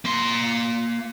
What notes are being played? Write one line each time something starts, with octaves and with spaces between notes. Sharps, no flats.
A#3 C6